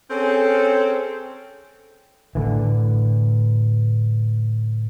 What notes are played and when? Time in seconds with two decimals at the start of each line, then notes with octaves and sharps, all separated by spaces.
0.10 C4 C#4 G#4 A4
2.35 A2 D3 E3